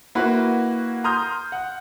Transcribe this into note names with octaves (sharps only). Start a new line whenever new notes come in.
A#3 E4 F#4 B4
A#5 C6 D#6 F6 G6
F#5